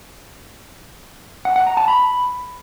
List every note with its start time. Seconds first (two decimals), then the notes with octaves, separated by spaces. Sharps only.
1.45 F#5
1.56 F#5
1.67 A#5
1.77 A5
1.88 B5